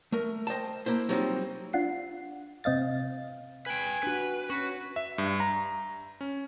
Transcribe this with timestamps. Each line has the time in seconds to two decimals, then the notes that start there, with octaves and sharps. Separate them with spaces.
0.12 A3 A#4
0.47 C5 D#5 G5 A5
0.86 A#3 E4 C5
1.09 F#3 G3 C4 D#4 F4 C5
1.73 D4 F4 F#5 C7
2.64 C3 C4 D#5 F5 A6
3.66 B4 G5 G#5
4.03 D4 F#4 B4
4.50 C#4 F#4 B4
4.96 E5
5.18 G2
5.40 A#5
6.21 C#4